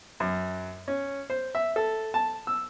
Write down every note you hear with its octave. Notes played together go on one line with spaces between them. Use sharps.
F#2
C#4
C5
E5
A4
A5
E6